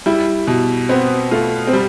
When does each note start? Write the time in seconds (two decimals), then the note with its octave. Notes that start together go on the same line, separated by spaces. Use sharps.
0.06 G3 E4
0.47 B2
0.89 B3 C4
1.31 A3 F4
1.67 C4
1.73 G3